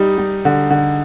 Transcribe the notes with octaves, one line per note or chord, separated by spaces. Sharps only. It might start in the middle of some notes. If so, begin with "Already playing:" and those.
Already playing: G3 D#4
G3
D3
D3